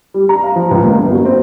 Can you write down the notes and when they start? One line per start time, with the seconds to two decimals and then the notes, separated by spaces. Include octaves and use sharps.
0.14 G3
0.29 A#5
0.43 F5
0.56 F3
0.71 C#2
0.83 A#3
0.99 G1
1.12 F#3
1.25 C4